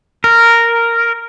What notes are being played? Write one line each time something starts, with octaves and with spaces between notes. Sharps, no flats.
A#4